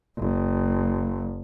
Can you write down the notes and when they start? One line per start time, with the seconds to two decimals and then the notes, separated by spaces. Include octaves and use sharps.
0.17 F#1